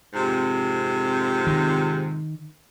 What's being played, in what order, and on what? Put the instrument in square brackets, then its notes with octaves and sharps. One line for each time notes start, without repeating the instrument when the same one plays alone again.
[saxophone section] F2 G#2 C3
[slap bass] D#3